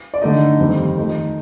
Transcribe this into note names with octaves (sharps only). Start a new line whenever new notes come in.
D5
D3 A3 D#4 D#5
F2 D#3 G3 C4
D#3 A3 D#4